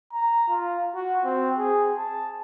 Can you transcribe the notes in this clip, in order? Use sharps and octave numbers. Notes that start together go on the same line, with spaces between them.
A#5
F4
F#4
C4
G#4
A5